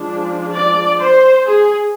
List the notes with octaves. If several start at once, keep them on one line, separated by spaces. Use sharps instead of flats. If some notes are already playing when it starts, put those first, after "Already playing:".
Already playing: F3 G#3 D4
D5
C5
G#4